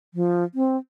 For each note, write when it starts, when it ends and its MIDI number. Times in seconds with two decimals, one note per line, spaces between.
0.14 0.44 53
0.55 0.77 60